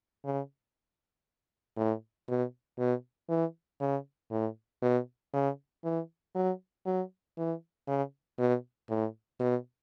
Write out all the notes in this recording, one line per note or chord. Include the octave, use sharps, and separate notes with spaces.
C#3
A2
B2
B2
E3
C#3
A2
B2
C#3
E3
F#3
F#3
E3
C#3
B2
A2
B2